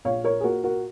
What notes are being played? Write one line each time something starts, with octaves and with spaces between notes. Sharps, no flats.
A#1 C#5 F5
A#4 C#5
G#4
A#2 F#4 A#4
F#4 A#4